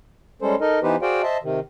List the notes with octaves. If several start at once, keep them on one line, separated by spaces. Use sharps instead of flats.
G3 G#3 C#4 A4 C5
D#4 A4 A#4 D#5
E3 B3 D#4 G4 B4 C5
F#4 G#4 C5 D5 F5 G5
C5 D#5 E5 A5
C3 D#3